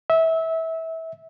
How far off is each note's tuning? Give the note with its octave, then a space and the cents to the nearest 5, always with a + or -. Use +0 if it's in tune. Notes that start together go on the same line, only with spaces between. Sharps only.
E5 -25